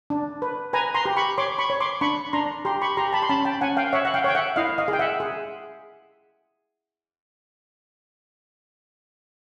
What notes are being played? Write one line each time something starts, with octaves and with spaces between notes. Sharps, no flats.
D4
B4
B4 G#5 A#5
A#5 C6
G4
B5 C#6
C#5 C6 D6
B5 C#6
C#5
C6 D6
D4 B5 C#6
D4 A#5 C6
G4 A#5 C6
B5 C#6
G4 A#5 C6
A5 B5
C6
C#4 A5 B5
G5 A5
C#4 F#5 G#5
F5 G5
C#5 E5 F#5
F#5
F5 G5
C#5 G5
E5 F#5
E4 D#5 F5
D#5 F5
G#4
G5
E5 F#5
G#4